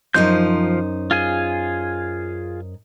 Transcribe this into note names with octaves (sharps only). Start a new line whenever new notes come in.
F#2 F3 D#4 C5 G6
F4 G#4 G#5